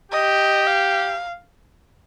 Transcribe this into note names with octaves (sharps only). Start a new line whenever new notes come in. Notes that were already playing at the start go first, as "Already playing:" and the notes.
G4 D#5
F5